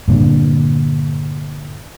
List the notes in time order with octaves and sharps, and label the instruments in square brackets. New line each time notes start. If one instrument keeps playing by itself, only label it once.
[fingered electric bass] G2 A#2 D3